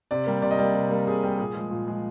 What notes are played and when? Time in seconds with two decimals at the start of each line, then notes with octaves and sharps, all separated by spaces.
0.11 C3 D5
0.26 G3 A#3
0.42 C3 D5
0.51 D#5
0.58 G3 A#3 D5
0.74 C3
0.90 G3 A#3
1.07 C3 G#4
1.23 G3 A#3
1.39 A#2 G#4
1.55 F3 G#3
1.71 A#2
1.87 F3 G#3